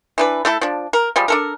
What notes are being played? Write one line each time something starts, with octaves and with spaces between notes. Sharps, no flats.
E3 D4 B4
A3 E4 A4
F3 D4
A#4
F3 G3 G#3
D4 A4 A#4